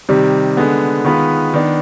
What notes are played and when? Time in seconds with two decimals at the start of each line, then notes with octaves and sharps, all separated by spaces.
0.09 C3 D#3 G3
0.57 D3 G#3 B3
1.05 D#3 G#3 B3 F4 B4
1.54 D#3 B3 D4